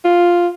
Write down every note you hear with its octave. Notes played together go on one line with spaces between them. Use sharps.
F4